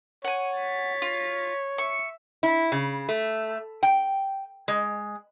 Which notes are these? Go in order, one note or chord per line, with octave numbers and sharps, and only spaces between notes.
C#5 F#5 G#5
A6 B6
F4
E5 C#6
E4
C#3
A3
G5
G#3